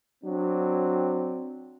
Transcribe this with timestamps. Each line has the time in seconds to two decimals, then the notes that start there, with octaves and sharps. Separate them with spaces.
0.24 F#3 C4 D4